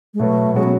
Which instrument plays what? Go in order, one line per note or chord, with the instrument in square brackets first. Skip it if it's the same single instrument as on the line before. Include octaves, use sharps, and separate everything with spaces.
[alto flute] G#3
[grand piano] B2 F#3 B3 [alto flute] A3
[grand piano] B2 F#3 C#4 F#4 [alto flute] G#3
[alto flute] B3